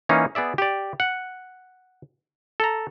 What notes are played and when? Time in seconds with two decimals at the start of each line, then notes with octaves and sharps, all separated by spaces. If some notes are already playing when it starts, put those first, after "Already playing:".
0.09 E3 A#3 C#4 D#4
0.35 B3 G#4 D5 E5
0.58 G4 D5
1.00 F#5
2.60 A4 A#5